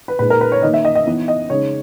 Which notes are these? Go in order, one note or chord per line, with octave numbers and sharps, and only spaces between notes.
B4
A#2 G#3 D#4 B4
A#4
B4
C#5
D#3 A#3 D#4 D#5
E5
D#5
D#5
E3 B3 D#4
D#5
C#3 G#3 D#4 C#5